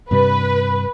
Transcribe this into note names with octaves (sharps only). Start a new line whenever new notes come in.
G2 C3 G3 B4